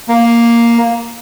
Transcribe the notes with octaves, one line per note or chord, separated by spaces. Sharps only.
A#3